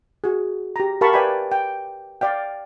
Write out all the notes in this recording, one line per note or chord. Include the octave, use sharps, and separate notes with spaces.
F#4 G#4
G4 A#5
G4 A#4 F5 A5 B5 C#6
B4 D5 E5 G5 G#5 B5
G5
D5 F5 G5